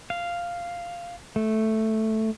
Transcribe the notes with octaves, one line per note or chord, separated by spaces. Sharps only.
F5
A3